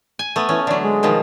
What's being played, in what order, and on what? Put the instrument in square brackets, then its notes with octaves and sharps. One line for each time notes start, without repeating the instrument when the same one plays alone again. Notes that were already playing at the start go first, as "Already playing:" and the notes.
[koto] G#5
A3 B3
[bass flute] E3 [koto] C#4
[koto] D3 F#3 [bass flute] D5
[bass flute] G#3
[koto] B2 D#3 F3